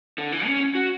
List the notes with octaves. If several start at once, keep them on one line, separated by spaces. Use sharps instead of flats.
D3
E3
C#4
F#4